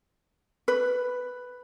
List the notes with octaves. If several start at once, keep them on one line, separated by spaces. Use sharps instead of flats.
B4